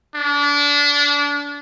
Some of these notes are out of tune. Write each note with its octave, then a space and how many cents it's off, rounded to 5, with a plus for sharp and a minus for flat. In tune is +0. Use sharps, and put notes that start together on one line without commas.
D4 -30